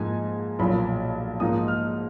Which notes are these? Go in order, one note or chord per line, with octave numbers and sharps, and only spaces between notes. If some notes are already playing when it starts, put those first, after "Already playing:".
Already playing: G#2 F3 A#3 D#4 G#5
B1 A#2 F3 A#3 B5
G#2 F3 A#3 D#4 D#6
F6